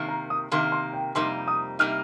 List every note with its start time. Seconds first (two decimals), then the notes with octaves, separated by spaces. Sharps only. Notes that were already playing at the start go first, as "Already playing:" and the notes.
Already playing: C3 D#3 A#3
0.09 A#5
0.30 D#6
0.51 C3 D#3 A#3 C6
0.72 C6
0.94 G5
1.15 F2 C3 G3 A#3 D#4 C6
1.48 D#6
1.79 C3 G3 A#3 D#4 F6